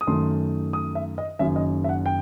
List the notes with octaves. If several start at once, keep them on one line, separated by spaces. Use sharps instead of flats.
D#6
F#2 D#3 A3 C6
D#6
E5
D#5
F#1 F#2 D#3 E5
D#5
E5
F#5
G5